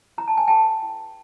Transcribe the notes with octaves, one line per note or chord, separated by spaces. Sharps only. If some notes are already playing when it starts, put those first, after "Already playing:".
E4 A#5
A5
G#5
G#4 B4 G5 A5
E4